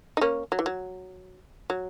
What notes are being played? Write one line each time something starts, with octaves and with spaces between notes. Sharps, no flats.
D#4
A#3 C#4
F#3
E3
F#3
F#3